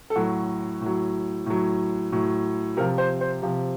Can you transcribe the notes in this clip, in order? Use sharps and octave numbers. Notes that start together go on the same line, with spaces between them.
A4
A2 F#3 F#4
A2 F#3
A2 F#3
A2 F#3
C3 F3 A#4
C5
C5
C3 F3